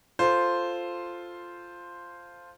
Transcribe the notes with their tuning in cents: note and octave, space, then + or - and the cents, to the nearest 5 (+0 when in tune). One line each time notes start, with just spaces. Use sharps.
F4 +0 A4 +0 C5 +0